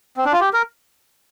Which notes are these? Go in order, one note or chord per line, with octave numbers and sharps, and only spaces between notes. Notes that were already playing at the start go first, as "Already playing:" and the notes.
C4
D4
F4
G4
A#4